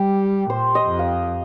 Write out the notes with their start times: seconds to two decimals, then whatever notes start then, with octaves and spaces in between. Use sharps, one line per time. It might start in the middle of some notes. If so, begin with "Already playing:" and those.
Already playing: G3 G4
0.50 A#2 C5
0.75 D#5
0.87 F2
0.99 F5